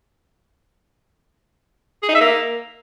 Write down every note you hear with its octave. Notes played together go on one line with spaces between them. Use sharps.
G#4
D#4
E5
A#3